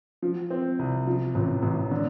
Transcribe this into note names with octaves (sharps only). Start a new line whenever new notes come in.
F3
C4
C2
F3
A1
A1
D3